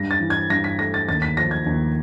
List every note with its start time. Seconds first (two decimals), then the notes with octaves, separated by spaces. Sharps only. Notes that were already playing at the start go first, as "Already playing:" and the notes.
Already playing: G2 A#6
0.11 A6
0.20 E3
0.30 G#6
0.50 G2 A#6
0.64 B6
0.79 A3 A#6
0.94 A6
1.08 D#2 A6
1.22 B6
1.37 F3 A#6
1.51 G#6
1.66 D#2